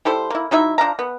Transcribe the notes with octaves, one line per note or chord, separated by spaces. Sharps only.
G3 E4 A4 C5
A#3 E4
F#3 D#4 E4 E5
F3 D4 F5 A#5
B3